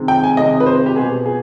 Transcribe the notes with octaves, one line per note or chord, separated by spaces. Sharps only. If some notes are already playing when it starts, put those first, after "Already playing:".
Already playing: C3 D#3 G#3 C4
G5
G#5
C3 D#3 G#3 C4 D#5
B4
C5
G4
B2 B3 G#4
G#4